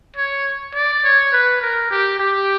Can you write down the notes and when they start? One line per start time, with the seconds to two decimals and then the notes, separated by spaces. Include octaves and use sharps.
0.16 C#5
0.75 D5
1.04 C#5
1.32 B4
1.62 A#4
1.91 G4
2.20 G4